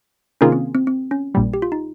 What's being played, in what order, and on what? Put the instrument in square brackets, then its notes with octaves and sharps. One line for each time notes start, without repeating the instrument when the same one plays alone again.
[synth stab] C3 D#3 A#3 F4 G#4 [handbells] C#4
[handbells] C4
C4
C4
C#4
[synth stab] A#1 A#2 G3
[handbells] G4
F4
D#4